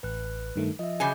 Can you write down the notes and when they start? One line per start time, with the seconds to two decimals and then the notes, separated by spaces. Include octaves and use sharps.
0.03 A1 B4 F#6
0.56 G2 D#3 A3
0.79 F3 D#5 E5
1.00 C#3 F#3 G#4 G#5 D6 G6